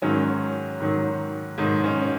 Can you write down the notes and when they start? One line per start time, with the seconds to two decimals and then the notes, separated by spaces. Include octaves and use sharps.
0.02 G#2 D#3 F#3 C#4
0.80 G#2 D#3 F#3
1.58 G#2 D#3 F#3 D#4
1.84 C#4
2.03 C#4